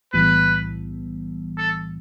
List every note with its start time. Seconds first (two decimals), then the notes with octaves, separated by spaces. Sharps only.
0.13 B1 A2 E3 G3 B3 B4
1.58 A4